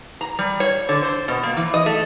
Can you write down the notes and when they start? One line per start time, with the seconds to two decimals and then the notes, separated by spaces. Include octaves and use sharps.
0.21 A#5
0.39 G3
0.60 C#5
0.89 D3
1.02 C5
1.28 B2
1.43 A#3
1.57 E3
1.74 D#5
1.86 A3